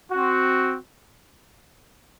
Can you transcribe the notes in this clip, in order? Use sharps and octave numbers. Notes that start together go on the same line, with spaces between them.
C4 F#4